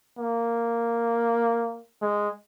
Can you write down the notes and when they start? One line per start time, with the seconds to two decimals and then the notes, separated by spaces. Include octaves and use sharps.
0.18 A#3
2.01 G#3